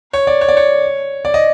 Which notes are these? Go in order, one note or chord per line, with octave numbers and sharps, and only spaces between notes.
C#5
D5
C#5
D5
C#5
D5
D#5